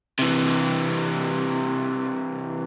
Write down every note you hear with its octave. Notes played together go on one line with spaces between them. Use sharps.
C3 E3